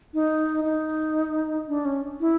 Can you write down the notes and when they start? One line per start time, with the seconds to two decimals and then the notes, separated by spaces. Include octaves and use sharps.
0.14 D#4
0.65 D#4
1.68 D4
1.85 C#4
2.20 E4